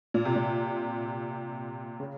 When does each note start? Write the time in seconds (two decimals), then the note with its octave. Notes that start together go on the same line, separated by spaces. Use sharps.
0.14 A#2
0.25 C3
0.35 A#2
2.00 C#3